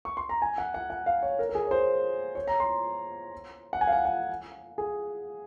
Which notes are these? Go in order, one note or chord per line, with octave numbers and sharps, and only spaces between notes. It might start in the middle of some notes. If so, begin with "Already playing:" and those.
C#6
C6
A#5
G#5
F#5
F#5
F#5
F5
C#5
A#4
A#4
G#4
C#5
C5
C#5
A#5
C6
F#5
G#5
F5
F#5
F#5
G#4